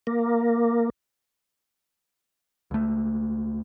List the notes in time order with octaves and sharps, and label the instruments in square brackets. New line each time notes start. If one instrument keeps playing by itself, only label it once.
[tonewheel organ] A#3
[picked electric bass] C#2 A3